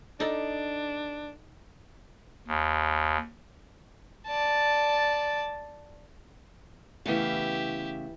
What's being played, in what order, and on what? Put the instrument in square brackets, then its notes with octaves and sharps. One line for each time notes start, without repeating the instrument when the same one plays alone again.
[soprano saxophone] D4 [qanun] D#4 A4 D5
[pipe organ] D#2
[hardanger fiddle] D5 A5
[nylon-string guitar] C#3 A3 B3 [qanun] E3 F5 [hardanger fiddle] G4 E5